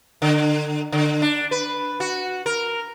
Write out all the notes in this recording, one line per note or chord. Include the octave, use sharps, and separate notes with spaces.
D3
D3
D4
B4
F#4
A#4